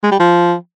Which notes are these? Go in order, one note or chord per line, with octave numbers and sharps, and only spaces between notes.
G#3
G3
F3